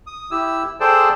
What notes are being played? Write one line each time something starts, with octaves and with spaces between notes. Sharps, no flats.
D#6
E4 G4 E6
G#4 A4 C5 D5 G5 A5